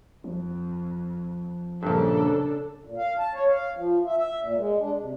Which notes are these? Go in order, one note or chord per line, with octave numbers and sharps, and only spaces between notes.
F2 F3
A#1 G2 C#3 D4 A4
A#2
F5
A5
C#5
F5
F3
E5
E5
A#2
G#3
D4
C3